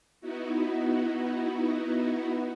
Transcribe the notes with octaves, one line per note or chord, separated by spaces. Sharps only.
B3 D#4 E4 F#4